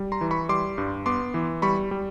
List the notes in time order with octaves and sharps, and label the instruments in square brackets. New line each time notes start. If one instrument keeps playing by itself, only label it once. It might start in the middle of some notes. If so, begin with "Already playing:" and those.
Already playing: [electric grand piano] G3
A#5 C6
E3
B5 C#6
G3 C6 D6
G2
B3 C6 D6
E3
G3 B5 C#6
G3